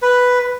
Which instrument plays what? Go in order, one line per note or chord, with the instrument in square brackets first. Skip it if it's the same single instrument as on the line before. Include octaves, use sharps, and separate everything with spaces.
[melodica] B4